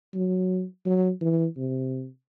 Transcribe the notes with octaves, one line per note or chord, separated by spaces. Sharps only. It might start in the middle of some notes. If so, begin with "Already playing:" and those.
F#3
F#3
E3
C3